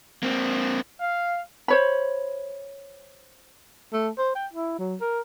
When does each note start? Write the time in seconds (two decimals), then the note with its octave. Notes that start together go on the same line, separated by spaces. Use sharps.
0.23 A#3 C4
1.01 F5
1.68 C5 C#5 B5
3.93 A3
4.18 C5
4.35 G5
4.53 E4
4.79 F#3
5.01 A#4